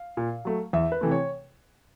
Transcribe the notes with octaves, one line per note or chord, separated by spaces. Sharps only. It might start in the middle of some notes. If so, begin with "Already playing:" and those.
Already playing: F5
A#2
F#3 A3
E2 E5
B4
C3 E3 A3
C#5